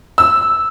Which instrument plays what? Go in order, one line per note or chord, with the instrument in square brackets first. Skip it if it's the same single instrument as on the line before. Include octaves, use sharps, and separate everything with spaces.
[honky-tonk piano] E6